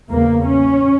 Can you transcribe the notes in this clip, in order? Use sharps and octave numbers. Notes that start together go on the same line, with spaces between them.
E2 C#3 A#3
C#4